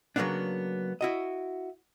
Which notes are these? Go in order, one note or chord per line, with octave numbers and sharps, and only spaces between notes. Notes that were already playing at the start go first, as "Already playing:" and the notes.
C#3 F#3 G#3 A#3 B3 D4
E4 F#4 D#5